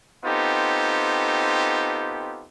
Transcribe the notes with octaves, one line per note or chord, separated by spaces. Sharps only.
B3 C4 D#4 F4 G4 A4